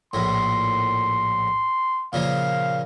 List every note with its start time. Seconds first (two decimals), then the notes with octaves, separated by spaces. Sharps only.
0.13 A#1 A2 C6
2.13 A#2 C#3 F3 F5